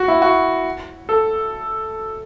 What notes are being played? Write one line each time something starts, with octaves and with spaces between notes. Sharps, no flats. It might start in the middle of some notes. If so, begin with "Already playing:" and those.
Already playing: F#4
E4
F#4
A4